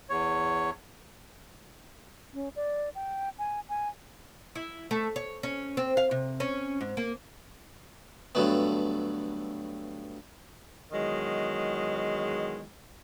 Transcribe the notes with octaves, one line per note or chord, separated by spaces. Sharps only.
E2 C#5
C#4
D5
G5
G#5
G#5
E4
A3
C#5
C#4
C4
F5
C3
C#4
G#2
A#3
G2 D3 F#3 A3 B3
E2 D#3 F#3 G#3